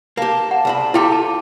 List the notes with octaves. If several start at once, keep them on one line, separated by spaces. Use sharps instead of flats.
A#3 G4 A5
F#5
C2 A#2 B5
E4 F4 G4 A4 G5 D6
A5